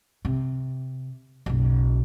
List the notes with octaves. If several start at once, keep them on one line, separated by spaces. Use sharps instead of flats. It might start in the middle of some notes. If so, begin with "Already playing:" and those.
C3
F#1 B1